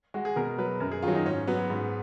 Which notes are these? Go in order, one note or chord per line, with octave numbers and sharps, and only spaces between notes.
G#3 F#4
G#4
B2 A#4
F#3 B4
F#2 A#4
G#4
D#3 F#3 F4
D#4
G#2 C#4
F#3 B3
G#2